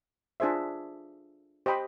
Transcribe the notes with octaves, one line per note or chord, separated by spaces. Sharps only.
D4 F4 G#4 C5 E5
G4 C5 D#5 G5 B5